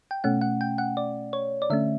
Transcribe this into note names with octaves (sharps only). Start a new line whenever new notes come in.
G5
B2 A3 C#4 F#5
F#5
G5
F#5
D5
C#5
D5
D3 A3 C#4 E5